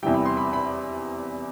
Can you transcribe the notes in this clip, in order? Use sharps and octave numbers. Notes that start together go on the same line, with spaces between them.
E2 C3 E3 G3 G5
B5
C6
B5
B5